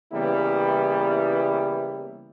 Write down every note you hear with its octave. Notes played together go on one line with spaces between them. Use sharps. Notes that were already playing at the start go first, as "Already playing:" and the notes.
C#3 E3 G3 A#3 B3 E4